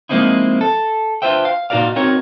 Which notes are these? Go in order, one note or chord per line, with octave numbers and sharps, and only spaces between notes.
F3 G#3 A#3 C4 D#4 E4
A4
D4 F4 B4 C5 E5 G5
F5
A#2 D#4 F#4 A#4 D5 F5
C4 D#4 F#4 A#4 C#5